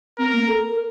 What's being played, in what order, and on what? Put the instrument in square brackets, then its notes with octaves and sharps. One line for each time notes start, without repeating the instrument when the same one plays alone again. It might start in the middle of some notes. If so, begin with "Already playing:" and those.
[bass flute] C4 [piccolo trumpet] A#4
[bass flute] A#3
A4
A#4